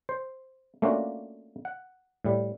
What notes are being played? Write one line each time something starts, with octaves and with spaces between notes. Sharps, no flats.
C5
A3 A#3 C#4 D4 F4 F#4
F#5
A2 G3